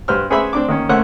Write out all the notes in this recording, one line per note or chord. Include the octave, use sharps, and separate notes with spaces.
G2 B4 C5 F6
C#4 G#4 B4 C5 E5 B5
C4 D4 D6
D#3 A#3 C#4
A3 A#3 C#4 C5 C#5 F#5